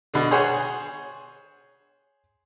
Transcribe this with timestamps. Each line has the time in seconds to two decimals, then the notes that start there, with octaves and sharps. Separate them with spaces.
0.14 B2 D3
0.31 G#4 C5 C#5 F#5 G#5